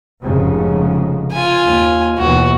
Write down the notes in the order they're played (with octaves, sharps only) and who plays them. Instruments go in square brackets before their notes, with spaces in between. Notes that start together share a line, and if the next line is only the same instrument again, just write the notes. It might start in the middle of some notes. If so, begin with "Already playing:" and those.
[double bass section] F1 G#2 C#3
[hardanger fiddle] F4 G#5
[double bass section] D#2
[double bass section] D#2 B2 E3 [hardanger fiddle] F#4